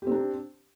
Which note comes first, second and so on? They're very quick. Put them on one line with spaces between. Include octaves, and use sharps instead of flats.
G4 C4 D4